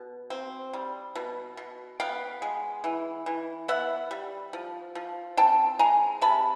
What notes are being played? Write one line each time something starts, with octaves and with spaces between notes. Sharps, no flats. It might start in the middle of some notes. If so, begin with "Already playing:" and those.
Already playing: B2
C4
G3
B2
B2
B3 F5 G5
G#3
E3
E3
B3 E5 F#5
G3
F3
F3
C4 G5 A5
G#3 G#5 A#5
C3 A5 B5